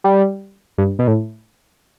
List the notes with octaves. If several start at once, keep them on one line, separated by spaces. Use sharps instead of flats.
G3
G2
B2
A2